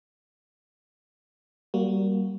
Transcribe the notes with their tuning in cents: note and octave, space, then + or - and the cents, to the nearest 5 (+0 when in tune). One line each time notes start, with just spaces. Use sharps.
G3 -20 A#3 +5 F#4 +0